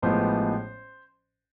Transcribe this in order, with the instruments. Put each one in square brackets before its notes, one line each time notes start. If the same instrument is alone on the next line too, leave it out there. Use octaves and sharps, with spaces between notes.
[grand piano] A1 A2 F3 G#3 B3 C5